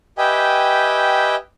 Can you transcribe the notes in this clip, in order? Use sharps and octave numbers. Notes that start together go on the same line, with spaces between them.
G4 B4 D#5 E5 G5 G#5